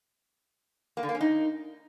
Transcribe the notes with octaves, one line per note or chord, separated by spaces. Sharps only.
A#3
D3
A#3
C#4
D#4